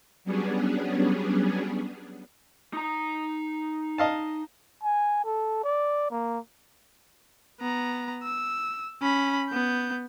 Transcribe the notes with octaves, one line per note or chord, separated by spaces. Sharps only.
F#3 G3 B3 C#4 D4 G#4
D#4 A#5
D#5 F5 A5
G#5
A4
D5
A#3
B3 A#5
E6
C#4 B5
B3 G6